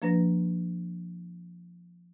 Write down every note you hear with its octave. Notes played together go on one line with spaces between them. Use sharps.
F3 A#3 D4 B4 A#6